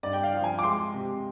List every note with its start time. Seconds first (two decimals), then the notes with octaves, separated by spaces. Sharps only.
0.03 G2 D5
0.13 G5
0.23 F5
0.33 F3
0.44 G#5
0.59 D6
0.63 G#3 C6
0.93 C3